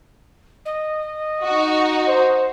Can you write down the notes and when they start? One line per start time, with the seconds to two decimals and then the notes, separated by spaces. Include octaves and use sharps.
0.65 D#5
1.45 D#4 F#4
2.08 C5